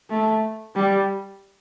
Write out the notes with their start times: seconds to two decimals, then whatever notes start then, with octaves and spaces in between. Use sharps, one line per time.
0.10 A3
0.75 G3